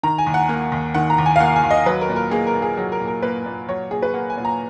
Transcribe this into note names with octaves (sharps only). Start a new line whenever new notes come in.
D#3 A#5
G#5
D#2
F#5
A#3
D#2
D#3 F#5
A#5
D#2
G#5
F5
A#3 F#5
G#5
D#2
D#5
F#3 B4
A#4
A#2
A#4
A#3 G#4
A#4
A#2
G#4
F#3 G#4
A#4
A#2
A#4
A#3 B4
A#2
F#3 C#5
A#2 G#4
B4
A#3 F#5
G#5
A#2
A#5